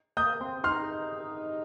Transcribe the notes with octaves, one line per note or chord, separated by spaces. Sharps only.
A#3 D#6 G6
C4
D#4 C6 F6